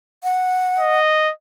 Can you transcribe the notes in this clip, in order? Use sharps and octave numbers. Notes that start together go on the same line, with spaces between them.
F#5
D#5